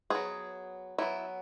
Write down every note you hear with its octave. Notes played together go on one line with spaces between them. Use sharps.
F#3 B3 G#4
F#3 B3 E4